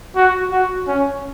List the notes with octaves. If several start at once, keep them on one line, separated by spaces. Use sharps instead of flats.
F#4
F#4
C#4